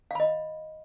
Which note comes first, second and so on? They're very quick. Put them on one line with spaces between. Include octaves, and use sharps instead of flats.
F5 B5 D#5